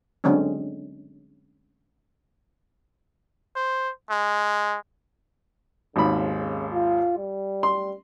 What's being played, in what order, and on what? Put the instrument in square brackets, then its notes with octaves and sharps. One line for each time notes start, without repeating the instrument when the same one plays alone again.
[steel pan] D3 F#3 G#3 C4 C#4
[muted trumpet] C5
G#3
[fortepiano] G#1 D#2 B5 [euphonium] C#3
[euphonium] C#3
F4
G3
[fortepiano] C6